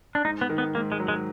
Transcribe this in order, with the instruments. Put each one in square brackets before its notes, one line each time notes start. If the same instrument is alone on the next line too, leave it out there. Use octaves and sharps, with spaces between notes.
[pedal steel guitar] D4
[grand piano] G#2 [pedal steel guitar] D#4
[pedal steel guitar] B3
[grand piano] D#3
[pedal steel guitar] B3
[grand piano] G#2 [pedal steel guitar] A#3
[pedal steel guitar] G#3
[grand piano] F#3
[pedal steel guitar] G#3